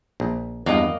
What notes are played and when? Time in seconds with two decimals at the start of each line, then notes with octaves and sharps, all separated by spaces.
0.20 A#1
0.66 E2 G2 A#3 D#5